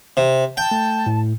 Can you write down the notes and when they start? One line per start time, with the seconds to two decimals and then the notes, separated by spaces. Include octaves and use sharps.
0.17 C3
0.57 G5 A5
0.71 A3
1.07 A2